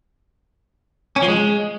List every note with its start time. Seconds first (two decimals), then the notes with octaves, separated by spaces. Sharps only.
1.16 C#4
1.22 F3
1.28 G#3